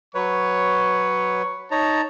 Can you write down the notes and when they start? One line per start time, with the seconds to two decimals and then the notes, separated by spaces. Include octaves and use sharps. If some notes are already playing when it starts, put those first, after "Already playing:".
0.15 F#3 B4 C#5 C#6
1.71 D#4 C#5 A5 A#5